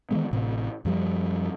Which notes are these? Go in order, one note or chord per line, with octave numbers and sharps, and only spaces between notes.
D#3 E3 G#3 B3
A1 A2 C3
F#2 F3 G3